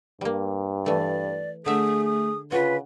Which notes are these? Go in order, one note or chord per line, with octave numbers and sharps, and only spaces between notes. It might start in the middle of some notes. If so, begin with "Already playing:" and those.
G2 G3 A#3
E3 A3 D5
D3 A3 G#4 E5 D#6
D#6
C#3 F4 F#4 B4